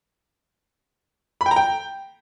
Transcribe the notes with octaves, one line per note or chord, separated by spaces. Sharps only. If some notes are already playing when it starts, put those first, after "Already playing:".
B5
G5
A#5
G5